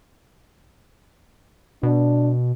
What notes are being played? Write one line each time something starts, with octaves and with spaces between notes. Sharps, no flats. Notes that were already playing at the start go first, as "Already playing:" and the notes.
B2 D4